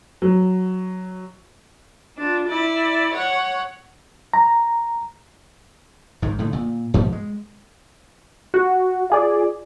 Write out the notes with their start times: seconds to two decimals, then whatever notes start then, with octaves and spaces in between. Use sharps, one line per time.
0.22 F#3
2.18 D4 F4
2.48 E4 D5
3.14 C#5 F#5
4.34 A#5
6.22 G#1 G#2 D#3
6.39 A2 D3 D#3
6.53 A#2
6.94 G#2 B2 F3 G3
7.12 G#3
8.54 F#4
9.10 F4 G#4 D5